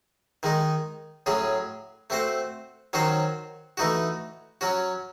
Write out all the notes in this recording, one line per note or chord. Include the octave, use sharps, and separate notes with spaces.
D#3 G#3 D#4
A2 F#3 C#4 G#4
A3 C4 F#4 C5
D#3 F#3 C#4 F#4 C5
E3 A3 D#4 F#4
F#3 C#4 F#4